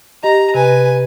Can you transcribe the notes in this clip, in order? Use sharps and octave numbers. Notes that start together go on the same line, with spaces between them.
G4 D#5 A#5
C3 B4 G#5